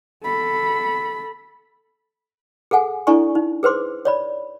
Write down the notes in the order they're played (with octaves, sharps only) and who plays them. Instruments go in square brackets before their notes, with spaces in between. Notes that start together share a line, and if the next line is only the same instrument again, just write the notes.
[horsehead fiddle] A4 B5
[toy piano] G#4 A4 F#5 G#5
D4 E4 A4 D5 G#5 C#6
D#4
G#4 B4 C5 C6 D6
C#5 D5 B5